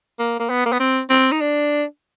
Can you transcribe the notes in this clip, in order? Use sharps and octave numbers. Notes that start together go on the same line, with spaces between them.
A#3
A#3
B3
A#3
B3
C4
C4
D#4
D4